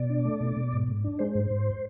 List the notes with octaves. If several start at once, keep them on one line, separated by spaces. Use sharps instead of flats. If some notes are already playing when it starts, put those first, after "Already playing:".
Already playing: B2 D5
D4
A3
B2
B2
G#2
G#2
D4
G#3 C5
G#2
G#2